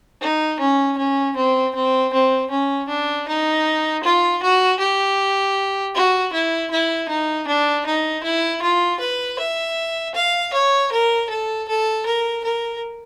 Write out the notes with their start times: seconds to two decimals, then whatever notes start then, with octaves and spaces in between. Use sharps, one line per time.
0.21 D#4
0.60 C#4
0.98 C#4
1.36 C4
1.75 C4
2.13 C4
2.50 C#4
2.89 D4
3.28 D#4
4.04 F4
4.43 F#4
4.80 G4
5.95 F#4
6.32 E4
6.71 E4
7.09 D#4
7.48 D4
7.86 D#4
8.24 E4
8.62 F4
9.00 B4
9.39 E5
10.15 F5
10.53 C#5
10.92 A#4
11.30 A4
11.68 A4
12.06 A#4
12.44 A#4